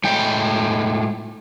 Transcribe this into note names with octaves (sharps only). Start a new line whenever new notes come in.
A2 G#3 G5